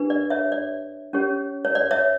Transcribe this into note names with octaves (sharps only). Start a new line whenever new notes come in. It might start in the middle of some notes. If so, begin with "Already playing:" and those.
Already playing: D4 G4 B4
D5
C#5 E5
D5
C#4 G4 C#5
C#5
D5
C#5 E5